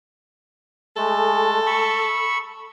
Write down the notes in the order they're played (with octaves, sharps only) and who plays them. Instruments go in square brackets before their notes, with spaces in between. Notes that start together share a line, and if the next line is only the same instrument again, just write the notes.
[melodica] G#3 A3 [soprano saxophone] A4
[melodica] B5 C#6 E6